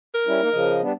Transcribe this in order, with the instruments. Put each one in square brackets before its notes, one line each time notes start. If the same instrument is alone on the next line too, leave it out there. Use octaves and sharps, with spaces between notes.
[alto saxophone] A#4
[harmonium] G3 C#4 E4
A#3 D#4
C#3 F3 D#5
G3 B3 D4